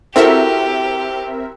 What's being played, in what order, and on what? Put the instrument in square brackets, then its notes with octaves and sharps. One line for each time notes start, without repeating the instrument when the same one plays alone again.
[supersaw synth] C4 A#4 E5 [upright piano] E4 F#4 A4 [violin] G4